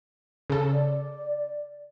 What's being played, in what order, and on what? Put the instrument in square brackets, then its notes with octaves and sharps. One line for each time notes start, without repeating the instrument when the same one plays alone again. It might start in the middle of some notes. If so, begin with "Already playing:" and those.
[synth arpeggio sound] C#3 A4
[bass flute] D5